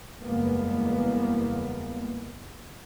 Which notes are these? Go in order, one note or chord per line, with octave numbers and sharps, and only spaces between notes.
F#1 E2 G3 G#3 A#3 B3